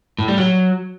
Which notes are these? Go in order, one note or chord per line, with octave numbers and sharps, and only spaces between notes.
A2
G3
F#3